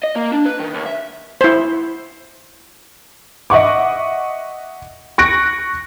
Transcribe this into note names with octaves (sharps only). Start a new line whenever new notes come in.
D#5
A#3
D4
B4
D#3
D#2
E5
E4 C5
D#5 E5 F#5 C#6 D6
C#6 F#6 A#6 D7